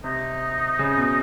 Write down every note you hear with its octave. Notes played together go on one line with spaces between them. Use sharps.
C3 D#4
C#3
B2